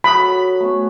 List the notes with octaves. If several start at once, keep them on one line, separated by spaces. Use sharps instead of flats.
F#3 A4 B5 D#6
A3 B3 C#4